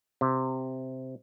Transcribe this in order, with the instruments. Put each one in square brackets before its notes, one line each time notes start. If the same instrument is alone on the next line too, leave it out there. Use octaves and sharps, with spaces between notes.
[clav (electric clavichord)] C3